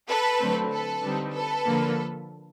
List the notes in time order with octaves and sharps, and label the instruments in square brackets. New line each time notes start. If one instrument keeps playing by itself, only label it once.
[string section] A4 B4
D3 F#3 A3 C4
A4 B4
D3 G3 C4 D#4
A4 B4
D3 F3 A#3